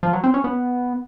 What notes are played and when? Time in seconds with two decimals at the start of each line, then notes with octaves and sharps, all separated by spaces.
0.03 F3
0.13 F#3
0.24 C4
0.34 C#4
0.44 B3